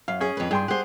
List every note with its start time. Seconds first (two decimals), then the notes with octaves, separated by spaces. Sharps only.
0.08 F#2 F5
0.21 C#4 G#4
0.37 F2 B4
0.51 G2 G#4 G5 C6
0.68 G4 G#4 C5 F#5